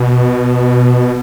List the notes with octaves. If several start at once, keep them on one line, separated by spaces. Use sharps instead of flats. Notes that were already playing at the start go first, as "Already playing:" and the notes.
Already playing: B2